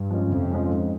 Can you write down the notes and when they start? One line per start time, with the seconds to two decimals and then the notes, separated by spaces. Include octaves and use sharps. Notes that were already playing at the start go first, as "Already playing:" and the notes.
Already playing: G2
0.11 F3 G#3 C#4
0.30 F2 C3
0.51 F3 G#3 C#4
0.70 G#2